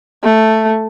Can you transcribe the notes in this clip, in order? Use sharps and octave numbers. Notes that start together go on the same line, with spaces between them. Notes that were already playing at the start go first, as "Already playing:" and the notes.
A3